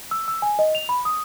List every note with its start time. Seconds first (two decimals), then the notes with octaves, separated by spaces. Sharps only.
0.11 E6
0.28 E6
0.42 G#5
0.59 D#5
0.75 F7
0.89 B5
1.05 D#6